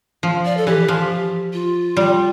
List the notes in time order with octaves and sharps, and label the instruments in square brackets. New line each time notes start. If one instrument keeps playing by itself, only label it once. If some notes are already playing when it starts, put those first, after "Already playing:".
[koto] F3
[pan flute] D5
A4
[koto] E3 [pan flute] G4
[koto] F3
[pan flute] F4
[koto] G3